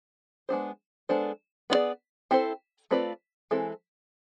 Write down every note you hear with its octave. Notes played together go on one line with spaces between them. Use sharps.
G#3 B3 D4 G#4 C5
G#3 B3 D4 A4 C5
B3 D4 G#4 D5
C4 E4 A4 C5
A3 C4 F4 B4 D5
E3 G#3 C4 E4 A4